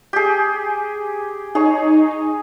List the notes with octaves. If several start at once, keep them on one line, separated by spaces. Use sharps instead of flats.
G4 G#4
D#4 G#4 C#5